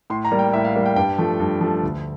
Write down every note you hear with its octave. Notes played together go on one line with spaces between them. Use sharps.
A2 C6
A#5
G3 A#3
G5
A2 E5
F5
G3 A#3 F5
G5
G2 G5
F3 A3
G2
F3 A3
D2